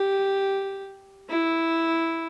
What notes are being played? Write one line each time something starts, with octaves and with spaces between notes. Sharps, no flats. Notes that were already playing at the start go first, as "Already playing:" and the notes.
Already playing: G4
E4